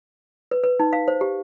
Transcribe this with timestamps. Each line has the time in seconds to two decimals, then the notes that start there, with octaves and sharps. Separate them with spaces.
0.51 B4
0.64 B4
0.80 D#4
0.93 F5
1.08 C5
1.21 G4